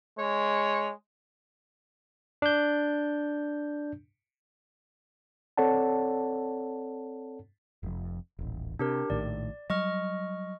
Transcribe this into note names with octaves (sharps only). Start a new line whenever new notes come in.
G#3 C#5
D4 G6
C4 A4 C#5 D5 F#5 A5
F1 F2
D#1 A1
C3 D4 G4 A#4
A#1 A2 D#3 D5
F#3 G3 D#5 C#6 F6